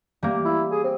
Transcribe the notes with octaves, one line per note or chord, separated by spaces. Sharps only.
G3 A#3
E4
G#4
C4